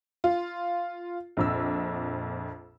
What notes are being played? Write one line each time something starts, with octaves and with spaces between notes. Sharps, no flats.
F4
A#1 F2 E6